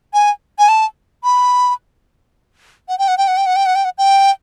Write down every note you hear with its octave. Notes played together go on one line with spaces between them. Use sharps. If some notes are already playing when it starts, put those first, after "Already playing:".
G#5
G#5
A5
B5
F#5
G5
F#5
G5
F#5
G5
F#5
G5
F#5
G5
F#5
G5